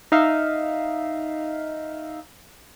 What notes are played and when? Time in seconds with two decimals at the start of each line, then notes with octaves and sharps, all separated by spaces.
0.12 D#4 E5 F5